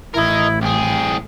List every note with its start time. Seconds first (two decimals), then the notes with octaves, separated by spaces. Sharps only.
0.14 A1 E4 A#4 D#5
0.62 C2 G#4 G5